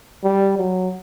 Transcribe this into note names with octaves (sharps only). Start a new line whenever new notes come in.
G3
F#3